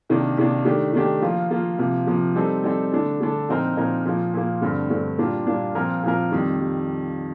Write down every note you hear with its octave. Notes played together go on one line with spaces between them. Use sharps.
C3 D#3 A#3 D4
C3 D#3 A#3 D4
D#3 A3 D4 G4
D#3 A3 D4 G4
F3 A#3 F4
F3 A#3 F4
C3 F3 A#3
C3 F3 A#3
G3 C4 D#4 A4
G3 C4 D#4 A4
D3 A3 D4 A4
D3 A3 D4 A4
A#2 F3 C4 D#4 A#4
A#2 F3 C4 D#4 A#4
A#2 F3 A#3
A#2 F3 A#3
G2 D3 A3 C4
G2 D3 A3 C4
A#2 G3 A#3 D4 F4
A#2 G3 A#3 D4 F4
A#2 F3 C4 F4 A#4
A#2 F3 C4 F4 A#4
F2 D#3 G3
G3